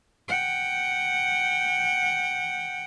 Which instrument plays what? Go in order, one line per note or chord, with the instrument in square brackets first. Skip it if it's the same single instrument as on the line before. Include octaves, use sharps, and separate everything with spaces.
[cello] F#5 G5